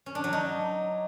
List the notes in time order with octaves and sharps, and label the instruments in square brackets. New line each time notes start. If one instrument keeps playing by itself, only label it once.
[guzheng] C#4
D4
F#3
D#4